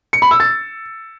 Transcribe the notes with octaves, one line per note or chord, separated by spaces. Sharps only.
C#7
B5
E6
A6